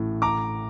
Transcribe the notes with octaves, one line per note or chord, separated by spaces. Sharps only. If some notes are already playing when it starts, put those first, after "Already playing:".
Already playing: A1 A2
A#5 D6